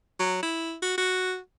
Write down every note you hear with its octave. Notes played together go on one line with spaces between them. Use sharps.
F#3
E4
F#4
F#4